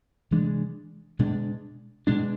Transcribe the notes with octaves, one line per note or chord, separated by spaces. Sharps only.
C3 E3 G#3 D4
B2 G#3 D4
B2 G#3 D4